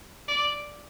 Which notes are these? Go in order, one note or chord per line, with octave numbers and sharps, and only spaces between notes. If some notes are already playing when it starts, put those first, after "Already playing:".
D5